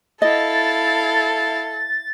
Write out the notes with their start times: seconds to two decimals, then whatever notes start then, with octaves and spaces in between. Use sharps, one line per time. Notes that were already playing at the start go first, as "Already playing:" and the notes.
0.22 E4 A4 D#5 F5 A6